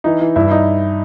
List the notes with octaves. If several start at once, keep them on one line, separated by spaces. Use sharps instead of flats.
E3 D#4
E3
G2 E4
D#4